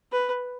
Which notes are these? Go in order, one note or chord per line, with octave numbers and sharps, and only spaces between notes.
B4